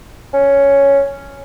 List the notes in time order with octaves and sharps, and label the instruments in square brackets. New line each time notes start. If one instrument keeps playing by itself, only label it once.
[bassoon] C#4